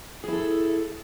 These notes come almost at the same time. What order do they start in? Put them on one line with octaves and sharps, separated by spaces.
G#4 E4 A4